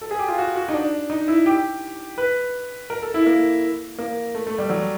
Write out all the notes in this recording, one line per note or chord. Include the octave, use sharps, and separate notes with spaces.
A4
G#4
G4
F4
F#4
F#4
D#4
D4
D#4
E4
G4
B4
A#4
A4
E4
A#3
A#3
A3
A3
G3
F#3